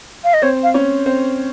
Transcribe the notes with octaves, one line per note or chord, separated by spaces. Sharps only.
F5
D#5
C4 C5 C#5
F5
C#4 C#5
C4 C5